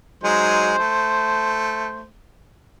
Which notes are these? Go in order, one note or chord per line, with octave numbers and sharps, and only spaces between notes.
F#3 G#3 D#4 C5
A3